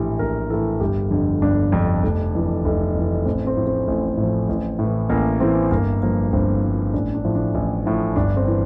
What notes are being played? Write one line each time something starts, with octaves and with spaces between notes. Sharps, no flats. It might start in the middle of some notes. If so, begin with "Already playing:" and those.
Already playing: A#1 A2 E3 G4
A#1 A#4
A2 E3 A4
G1 G4
F2 D3
G1 D4
F2 D3
F1
F2 E3
F1
F2 E3
A1 C4
C4
A2 F3
C4
A1
A2 F3
A1
A2
E3
A1 A#3
A2 E3 C4
G1 A#3
G2 F3 A#3
G1 C4
G2 F3
A1 D4
D4
A2 F3
D4
A1
A2 F3
G1 D4
C4
E3